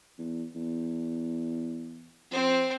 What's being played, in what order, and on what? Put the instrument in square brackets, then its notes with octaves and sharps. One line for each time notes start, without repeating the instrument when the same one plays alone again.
[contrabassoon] E2
E2
[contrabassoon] F2 [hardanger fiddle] C4 C5